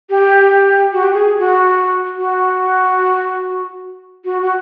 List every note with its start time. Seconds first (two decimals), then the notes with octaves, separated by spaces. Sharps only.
0.10 G4
0.93 F#4
1.03 G4
1.13 G#4
1.39 F#4
2.17 F#4
4.25 F#4
4.42 F#4